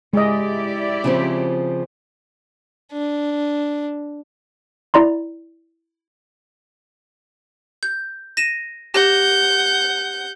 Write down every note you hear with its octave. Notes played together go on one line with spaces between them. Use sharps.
G#3 E4 G4 D5 D#5
C#3 F3 C4
D4
E4 D5 A#5 C6
G6
A#6 D#7 E7
G4 F#5 G6 A#6